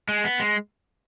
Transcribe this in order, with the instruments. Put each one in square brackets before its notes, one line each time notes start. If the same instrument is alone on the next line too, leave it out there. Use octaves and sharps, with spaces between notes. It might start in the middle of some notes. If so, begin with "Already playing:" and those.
[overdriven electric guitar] G#3
B3
G#3